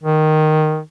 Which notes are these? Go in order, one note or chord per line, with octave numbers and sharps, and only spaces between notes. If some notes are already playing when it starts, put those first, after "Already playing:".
D#3